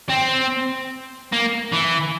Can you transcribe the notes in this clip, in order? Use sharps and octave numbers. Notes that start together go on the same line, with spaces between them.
C4
A#3
E3